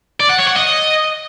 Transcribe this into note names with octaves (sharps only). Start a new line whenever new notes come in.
D5
F#5
C#5
F#5
D#5